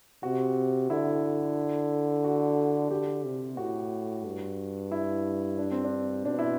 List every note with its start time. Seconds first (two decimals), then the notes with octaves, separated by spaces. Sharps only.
0.23 C3 F#4
0.90 D3 E4
2.24 F#4
2.90 D3 G4
3.25 C3
3.57 A2 F#4
4.25 G2
4.92 E4
5.58 D4
5.71 C4
5.84 D4
6.25 B2 D4
6.39 E4